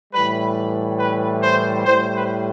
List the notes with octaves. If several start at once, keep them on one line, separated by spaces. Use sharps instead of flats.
A2 E3 G3 B4
B4
C5
A2 G3 C5
B4